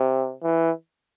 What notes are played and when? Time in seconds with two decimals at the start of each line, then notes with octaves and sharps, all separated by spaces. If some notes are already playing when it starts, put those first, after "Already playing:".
Already playing: C3
0.43 E3